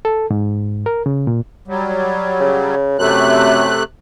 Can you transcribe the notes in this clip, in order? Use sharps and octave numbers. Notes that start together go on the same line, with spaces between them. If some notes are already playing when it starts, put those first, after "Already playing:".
A4
G#2
A#4
C#3
A#2
F#3 G3
C#3
F#2 C3 A3 F#6